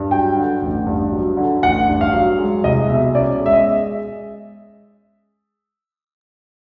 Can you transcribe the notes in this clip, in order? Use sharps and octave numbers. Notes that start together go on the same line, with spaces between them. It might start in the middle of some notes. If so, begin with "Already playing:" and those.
Already playing: G2
F#3 G5
D3
A1
G2
F#3
D3
A1 F#5
G2
F5
F#3
G#3
C2 D#5
B2 E5
C#4 D5
G#3
E5
D#5